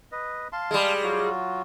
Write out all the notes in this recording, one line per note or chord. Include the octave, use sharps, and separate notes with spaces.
B4 D#5
F5 A5 C6
G3 G#3
F#3 F4 F#4